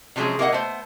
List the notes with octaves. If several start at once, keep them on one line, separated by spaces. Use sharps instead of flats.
C3 F3 F#3 G#3 C#4 G#4
A#3 E4 G#4 A4 D#5 F#5
A3 B3 C5